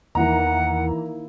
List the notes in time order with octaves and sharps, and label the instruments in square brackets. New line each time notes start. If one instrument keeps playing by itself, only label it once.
[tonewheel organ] E2 [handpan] D#3 A#3 E4 [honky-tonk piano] E3 A#5 [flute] F#5